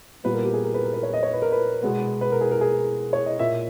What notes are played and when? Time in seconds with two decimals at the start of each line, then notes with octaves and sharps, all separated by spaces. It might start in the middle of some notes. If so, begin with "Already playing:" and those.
0.24 A#2 G3 B3 B4
0.34 A#4
0.45 G4
0.54 G#4
0.64 A#4
0.74 B4
0.84 A#4
0.93 B4
1.03 C#5
1.14 D#5
1.23 C#5
1.33 B4
1.42 A#4
1.52 B4
1.83 B2 G#3 B3
2.21 B4
2.32 A#4
2.41 G#4
2.51 A#4
2.61 G#4
3.13 C#5
3.26 D#5
3.39 A#2 A#3 E5